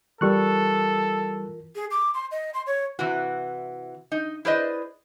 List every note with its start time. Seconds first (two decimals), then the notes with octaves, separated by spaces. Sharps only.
0.21 E3 G3 F4 A4 A#4 C#6 F#6
1.76 G#4
1.91 D6
2.14 C6
2.31 D#5
2.54 C6
2.67 C#5
2.99 C3 E3 F#4
4.12 D#4
4.45 E4 G#4 B4 C5 D5 D#5